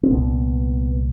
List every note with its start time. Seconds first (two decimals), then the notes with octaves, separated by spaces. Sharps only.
0.03 C4
0.11 C2 A#2 B3